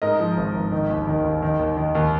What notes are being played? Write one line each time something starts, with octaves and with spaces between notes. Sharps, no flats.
G#2 A#4 D#5
F3
G#1
G#1
D#3
D#2
D#3
D#2
D#3
D#2
D#3
D#2